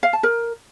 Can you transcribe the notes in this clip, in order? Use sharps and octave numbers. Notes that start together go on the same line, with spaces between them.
F5
A5
A#4